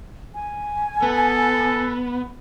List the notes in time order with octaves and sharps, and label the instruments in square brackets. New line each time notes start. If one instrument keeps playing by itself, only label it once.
[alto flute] G#5
[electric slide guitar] B3 [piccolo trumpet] A4